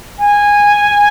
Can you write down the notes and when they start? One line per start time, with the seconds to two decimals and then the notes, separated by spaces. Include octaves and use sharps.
0.19 G#5